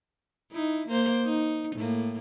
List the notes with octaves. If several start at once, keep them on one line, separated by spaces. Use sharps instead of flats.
D#4 E4
A#3 C5
D#4
A2 A#3